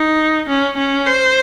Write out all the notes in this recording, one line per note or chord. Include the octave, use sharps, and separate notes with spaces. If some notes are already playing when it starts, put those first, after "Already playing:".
Already playing: D#4
C#4
C#4
C5